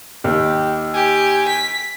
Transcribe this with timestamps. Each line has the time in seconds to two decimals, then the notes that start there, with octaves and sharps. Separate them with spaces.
0.24 D#2 G4
0.94 G4 G#5
1.48 B6